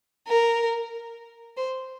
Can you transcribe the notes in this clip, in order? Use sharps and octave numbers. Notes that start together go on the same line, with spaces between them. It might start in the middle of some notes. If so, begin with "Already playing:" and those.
A#4
C5